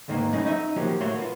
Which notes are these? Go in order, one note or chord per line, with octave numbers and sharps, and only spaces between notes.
D#2 G#2 D#3 E3 A#3
F#3 A3 C#4 D#4 E4
D#4 D#5 E5
D#3 F3 F#3 A#3 G4
A2 A3 A#3 F#4 C#5 C6
B3 F4